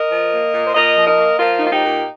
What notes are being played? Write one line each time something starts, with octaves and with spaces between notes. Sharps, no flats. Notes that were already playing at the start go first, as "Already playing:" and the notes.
Already playing: A#4 D#5
F3
A#3
A#2
C5
A#2 A#4 D#5
F3
A#4 D#5
A#3
F3 F4 A#4
D#4
A#3 F4
D#4 G4
A#2